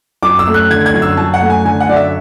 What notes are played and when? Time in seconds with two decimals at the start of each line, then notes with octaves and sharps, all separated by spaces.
0.23 F#2 D6
0.39 E6
0.47 A3
0.54 F#6
0.70 D3 G#6
0.86 G#6
0.94 F#2
1.02 E6
1.17 F#2 A5
1.34 F#5
1.41 A3
1.50 G#5
1.65 D3 G#5
1.80 F#5
1.89 F#2 D5
1.96 E5